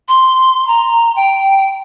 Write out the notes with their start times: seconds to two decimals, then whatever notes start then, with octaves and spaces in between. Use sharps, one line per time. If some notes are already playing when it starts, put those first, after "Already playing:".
0.08 C6
0.67 A#5
1.16 G5